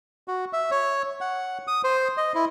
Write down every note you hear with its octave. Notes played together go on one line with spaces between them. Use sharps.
F#4
E5
C#5
F#5
D#6
C5
D#5
E4